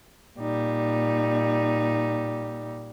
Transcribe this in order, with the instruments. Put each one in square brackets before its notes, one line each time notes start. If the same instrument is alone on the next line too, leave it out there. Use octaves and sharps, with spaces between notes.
[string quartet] A#2 G3 D#4